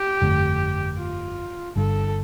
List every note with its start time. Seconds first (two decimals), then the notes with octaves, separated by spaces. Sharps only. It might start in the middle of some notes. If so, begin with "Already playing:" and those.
Already playing: G4
0.22 G1 F2 D3 A3
0.98 F4
1.76 G1 G2 D3 A4